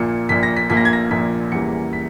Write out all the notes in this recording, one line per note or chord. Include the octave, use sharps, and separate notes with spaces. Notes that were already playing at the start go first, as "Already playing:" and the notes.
Already playing: A#1 A#2 A#3 C#7
A#1 A#2 A#3 B6
A#6
B6
A#1 A#2 A#3 B6
A#6
G#6
A#6
A#1 A#2 A#3 B6
E2 C#3 E3 G3 A#3 C#7
B6